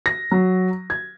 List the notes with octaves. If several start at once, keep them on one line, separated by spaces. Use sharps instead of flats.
A#6
F#3
G#6